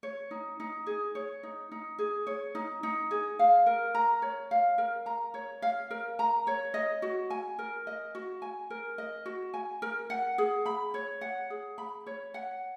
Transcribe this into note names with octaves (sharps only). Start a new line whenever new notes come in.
C#5
D#4
D#4
G#4
C#5
D#4
D#4
G#4
C#5
D#4
D#4
G#4
F5
A#4
A#5
C#5
F5
A#4
A#5
C#5
F5
A#4
A#5
C#5
D#5
F#4
G#5
A#4
D#5
F#4
G#5
A#4
D#5
F#4
G#5
A#4
F#5
G#4
B5
C#5
F#5
G#4
B5
C#5
F#5